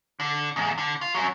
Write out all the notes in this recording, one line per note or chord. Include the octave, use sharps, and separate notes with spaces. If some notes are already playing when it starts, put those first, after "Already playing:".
D3
E2 G#2
D3
F4
F#2 F#3